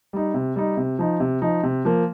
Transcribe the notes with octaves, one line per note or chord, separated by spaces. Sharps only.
G3 D#4
C3
G3 D#4
C3
F3 D#4
C3
F3 D#4
C3
F3 A#3